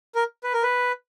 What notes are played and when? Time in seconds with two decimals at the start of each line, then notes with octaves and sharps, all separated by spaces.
0.15 A#4
0.44 B4
0.53 A#4
0.63 B4